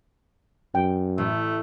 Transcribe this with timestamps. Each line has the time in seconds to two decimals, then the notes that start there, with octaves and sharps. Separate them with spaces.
0.75 F#2 G5
1.18 A1 A3